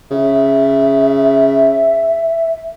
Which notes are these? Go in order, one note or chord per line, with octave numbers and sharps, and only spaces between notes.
C#3 E5